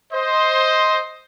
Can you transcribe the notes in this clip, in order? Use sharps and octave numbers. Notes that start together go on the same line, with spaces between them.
C5 D#5